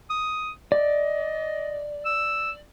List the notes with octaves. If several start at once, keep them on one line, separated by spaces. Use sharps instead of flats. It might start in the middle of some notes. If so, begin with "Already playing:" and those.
D#6
D5 D#5
E6